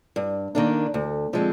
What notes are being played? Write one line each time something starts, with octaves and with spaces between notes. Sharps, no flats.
G2
D#3 A#3 D4
D2
D3 F3 G#3 C4